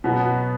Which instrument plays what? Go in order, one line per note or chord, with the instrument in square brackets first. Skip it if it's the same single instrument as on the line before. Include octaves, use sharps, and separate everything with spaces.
[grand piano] B2 F#3 B3